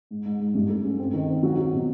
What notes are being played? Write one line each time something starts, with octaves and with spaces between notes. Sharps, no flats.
G#2
G#2
G#2
G2
A3
C#4
C4
D#3
C4
F#3
F#3
B2